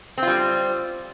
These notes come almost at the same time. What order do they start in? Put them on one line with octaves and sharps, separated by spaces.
C4 F4 G3